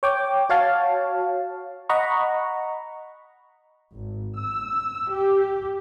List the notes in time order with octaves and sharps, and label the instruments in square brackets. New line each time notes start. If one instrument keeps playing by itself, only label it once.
[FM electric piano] C#5 G5 D6
F#4 C#5 F5 A5
D#5 F#5 A#5 B5 C#6
[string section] G#1
E6
G4